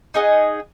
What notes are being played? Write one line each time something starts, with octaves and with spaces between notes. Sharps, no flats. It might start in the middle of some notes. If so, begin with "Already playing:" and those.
D#4 G#4 D#5 F#5